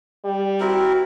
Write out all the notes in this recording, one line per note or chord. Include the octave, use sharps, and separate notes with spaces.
G3
C4 E4 F#4 A#4